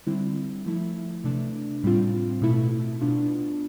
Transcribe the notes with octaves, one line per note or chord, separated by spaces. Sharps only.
D3 G3 C4 E4
F3 A3 E4
C3 E3 A3 D4
A2 G3 C4 F4
B2 A3 E4
B2 B3 D4 F4